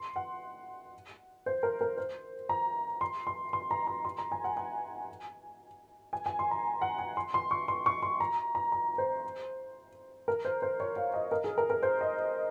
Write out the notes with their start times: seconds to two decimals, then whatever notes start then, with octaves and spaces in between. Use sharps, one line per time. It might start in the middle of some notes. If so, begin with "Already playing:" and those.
Already playing: C6
0.16 F#5
1.46 C5
1.63 A#4
1.81 A#4
1.97 C5
2.49 A#5
3.01 C6
3.27 C6
3.53 C6
3.71 A#5
3.87 A#5
4.05 C6
4.18 A#5
4.32 G#5
4.44 F#5
4.57 G#5
6.13 G#5
6.26 G#5
6.39 C6
6.51 A#5
6.81 F#5
6.98 G#5
7.17 C6
7.34 C6
7.51 C#6
7.68 C6
7.86 C#6
8.03 C6
8.20 A#5
8.55 A#5
8.72 A#5
8.98 C5
10.28 A#4
10.45 C5
10.62 C5
10.80 C#5
10.96 F5
11.14 D#5
11.32 A#4
11.44 G#4
11.58 A#4
11.70 A#4
11.83 C5
12.01 D#5